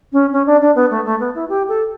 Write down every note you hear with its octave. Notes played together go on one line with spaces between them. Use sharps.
C#4
C#4
D4
D4
B3
A3
A3
B3
E4
G4
A4